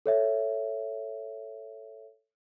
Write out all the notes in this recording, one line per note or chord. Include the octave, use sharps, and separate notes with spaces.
A4 C#5 E5